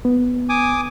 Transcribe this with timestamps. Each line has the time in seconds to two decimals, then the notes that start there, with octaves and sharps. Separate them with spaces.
0.05 B3
0.49 G#5 D6 D#6